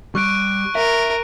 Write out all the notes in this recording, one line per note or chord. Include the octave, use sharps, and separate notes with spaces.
G3 C#6 F#6 D7
A#4 E5